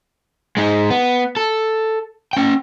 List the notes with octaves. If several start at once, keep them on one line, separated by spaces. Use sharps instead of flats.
G#3 D#4
B3
A4
C#4 G5